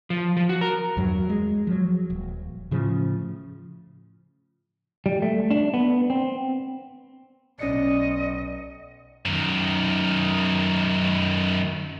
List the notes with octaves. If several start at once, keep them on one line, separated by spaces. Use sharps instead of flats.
F3
F3
F#4
A#4
E2 G2 F#3
G#3
F3 F#3
D#1
A2 C#3 F3
G3
A3
D4
B3
C4
B1 B2 C#4 D5 D#5 C#7
F#2 D#3